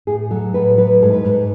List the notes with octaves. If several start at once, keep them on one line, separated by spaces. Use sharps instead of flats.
A2 G#4
F#3 A4
A2 B4
C#5
F#3 B4
G#2 A4
B4
G#2